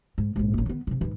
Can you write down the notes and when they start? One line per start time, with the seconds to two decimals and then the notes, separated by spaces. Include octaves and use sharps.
0.18 G#2
0.36 A#1 G#2
0.54 A1 A#3
0.66 D#3 B3
0.87 C3 D#3
1.01 G#2 E3